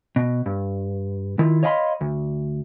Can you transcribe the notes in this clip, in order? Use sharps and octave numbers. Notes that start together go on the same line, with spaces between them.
B2
G2
D#3 E4 F4
C#5 D#5 F5 G5 B5 C6
D2